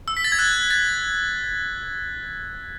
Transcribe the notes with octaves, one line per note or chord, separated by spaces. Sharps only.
E6
B6
A6
G#6
F#6
A6